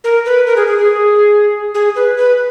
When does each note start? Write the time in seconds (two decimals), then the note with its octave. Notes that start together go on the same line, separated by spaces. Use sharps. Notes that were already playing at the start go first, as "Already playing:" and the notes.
0.04 A#4
0.26 B4
0.47 A#4
0.56 G#4
0.67 G#4
0.78 G#4
1.74 G#4
1.96 B4
2.17 B4